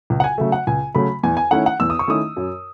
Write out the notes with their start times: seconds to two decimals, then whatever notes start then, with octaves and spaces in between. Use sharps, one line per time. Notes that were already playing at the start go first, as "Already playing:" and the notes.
0.10 C#2
0.20 F#5
0.24 G#5
0.38 C#3 F#3 A3 E5
0.52 F#5
0.67 C#2 G#5
0.95 C#3 F#3 A3 B5
1.23 E2 G#5
1.37 G#5
1.51 D#3 A3 C#4 E4 F#5
1.66 F#5
1.80 E2 E6
1.90 D#6
1.99 C#6
2.08 D#3 A3 C#4 E4 D#6
2.37 F#2